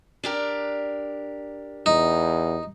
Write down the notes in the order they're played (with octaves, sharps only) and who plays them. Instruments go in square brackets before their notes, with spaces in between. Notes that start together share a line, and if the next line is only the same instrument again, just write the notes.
[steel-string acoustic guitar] D4 G4 A#4
[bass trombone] E2 [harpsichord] D#4